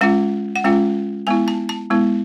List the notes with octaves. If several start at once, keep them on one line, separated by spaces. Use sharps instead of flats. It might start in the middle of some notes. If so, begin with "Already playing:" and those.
G#3 C#4 F4 F#5
F#5
G#3 C#4 F4 G5
G#3 B3 E4 G#5
A5
A5
G#3 B3 E4